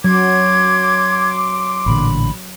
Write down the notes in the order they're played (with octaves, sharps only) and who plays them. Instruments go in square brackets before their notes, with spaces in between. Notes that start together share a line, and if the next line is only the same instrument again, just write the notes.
[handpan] F#3 [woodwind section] C6 D6 [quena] G#6
[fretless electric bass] A1 A#2 D3 [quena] B5